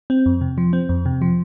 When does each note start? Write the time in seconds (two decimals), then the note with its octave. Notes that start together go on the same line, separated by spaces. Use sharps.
0.10 C4
0.26 F2
0.41 C3
0.58 F3
0.73 C4
0.89 F2
1.06 C3
1.22 F3